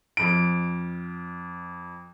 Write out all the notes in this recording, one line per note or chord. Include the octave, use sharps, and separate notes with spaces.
F2 D7